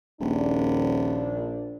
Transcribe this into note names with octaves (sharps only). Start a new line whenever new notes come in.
D#1 A#1 D4